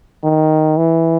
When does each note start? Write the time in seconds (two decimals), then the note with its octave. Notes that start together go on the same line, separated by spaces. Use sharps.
0.24 D#3
0.77 E3